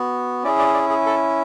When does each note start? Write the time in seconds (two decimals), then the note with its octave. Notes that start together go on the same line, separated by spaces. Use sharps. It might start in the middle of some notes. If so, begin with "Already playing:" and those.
Already playing: B3 F#4
0.44 C#4 E4 G#4 D5
0.59 D5
0.74 D5
0.89 G#4
1.06 A4